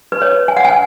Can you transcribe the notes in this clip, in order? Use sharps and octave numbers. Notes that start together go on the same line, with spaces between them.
B4
C#5
G#5
F#5
G#5